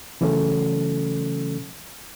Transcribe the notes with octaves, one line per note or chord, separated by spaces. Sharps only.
C#3 E3 F#3 A3 C#4 A4